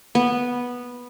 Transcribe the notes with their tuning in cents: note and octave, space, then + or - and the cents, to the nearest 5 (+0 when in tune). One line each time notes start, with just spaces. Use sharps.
B3 -10